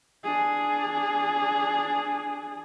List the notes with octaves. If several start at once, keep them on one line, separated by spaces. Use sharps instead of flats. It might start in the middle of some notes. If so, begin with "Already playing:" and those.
D4 G#4